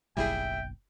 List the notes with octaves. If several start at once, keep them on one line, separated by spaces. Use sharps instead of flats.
F#1 B1 G3 E4 G#4 E5 G5